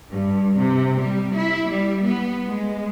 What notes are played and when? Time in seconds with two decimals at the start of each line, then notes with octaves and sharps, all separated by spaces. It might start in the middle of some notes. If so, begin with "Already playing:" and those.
0.11 G2
0.57 C3
1.02 G3
1.34 E4
1.68 G3
2.06 B3
2.48 G#3